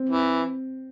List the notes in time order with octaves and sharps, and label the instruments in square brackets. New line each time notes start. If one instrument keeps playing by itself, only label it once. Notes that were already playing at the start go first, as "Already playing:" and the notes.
Already playing: [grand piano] C4
[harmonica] E3